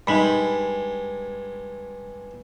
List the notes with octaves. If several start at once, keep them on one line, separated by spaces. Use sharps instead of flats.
G2 G#3 D#4 B5